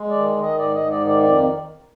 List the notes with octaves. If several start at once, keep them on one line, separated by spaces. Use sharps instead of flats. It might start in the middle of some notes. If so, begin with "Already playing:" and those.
Already playing: G#3
D#3 D5
D#3 D#5
G#2 D5
G#2 D#5
D5
D#3
D5
F2 D5